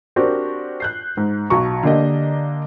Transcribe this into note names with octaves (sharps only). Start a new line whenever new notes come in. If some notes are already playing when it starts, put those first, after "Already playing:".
C4 D4 F#4 G4 A#4 C5
F#6 G6 C7
G#2
B1 F#4 A#5 C#6
D3 A#3 D4 G4 D#5